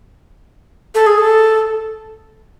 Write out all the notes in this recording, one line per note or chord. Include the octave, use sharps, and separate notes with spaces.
A4
G#4
A4